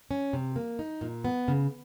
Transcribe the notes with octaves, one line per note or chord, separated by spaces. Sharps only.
C#4
C3
A#3
D#4
A#2
B3
C#3